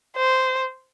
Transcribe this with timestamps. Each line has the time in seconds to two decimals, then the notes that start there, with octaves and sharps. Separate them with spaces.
0.17 C5